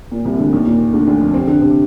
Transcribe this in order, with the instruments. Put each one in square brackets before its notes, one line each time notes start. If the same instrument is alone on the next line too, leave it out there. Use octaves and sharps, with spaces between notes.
[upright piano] A#2
C2 C3
D2 D3
D#2 D#3
A#2
D2 D3
D2 D3
F2 F3
C3 C4
D3 D4
C3 C4